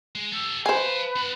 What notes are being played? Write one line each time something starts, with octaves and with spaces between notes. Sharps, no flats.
G#3
G4 A4 E6
B4 C5 F5 G#5 A5
C4 F#5